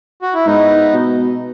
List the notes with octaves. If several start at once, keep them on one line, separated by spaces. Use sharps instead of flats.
F#4
E4
G#2 B3 D#4
B2